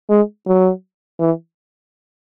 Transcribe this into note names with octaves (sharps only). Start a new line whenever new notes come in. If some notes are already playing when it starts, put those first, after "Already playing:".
G#3
F#3
E3